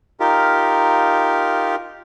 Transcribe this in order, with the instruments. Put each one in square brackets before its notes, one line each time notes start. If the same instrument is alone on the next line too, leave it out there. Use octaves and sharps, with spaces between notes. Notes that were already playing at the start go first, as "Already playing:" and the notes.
[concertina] D#4 F4 G4 A#4